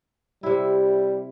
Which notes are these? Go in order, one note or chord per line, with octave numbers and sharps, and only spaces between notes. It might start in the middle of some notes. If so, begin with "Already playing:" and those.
C3 G3 E4